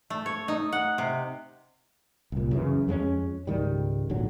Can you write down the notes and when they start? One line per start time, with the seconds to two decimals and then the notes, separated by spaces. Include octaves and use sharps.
0.10 A3
0.26 C#5
0.48 D#4
0.72 F#5
0.98 C3
2.32 C2 A#2
2.51 F#2 C#3 E3
2.87 F2 G#3 A3 C#4
3.47 C#2 G#2 D#3 G3
4.10 A#1 G#2 D3 F#3